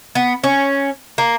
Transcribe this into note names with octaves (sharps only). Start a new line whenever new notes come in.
B3
C#4
A#3